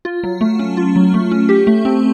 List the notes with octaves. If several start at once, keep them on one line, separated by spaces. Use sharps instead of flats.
F4
F#3
A3
C#4
F4
F#3
A3
C#4
G4
A3
C4